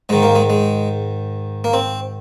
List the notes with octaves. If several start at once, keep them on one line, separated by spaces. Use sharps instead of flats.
G#2 D#3 G#3
A#3
G#3
G#3
A#3
C4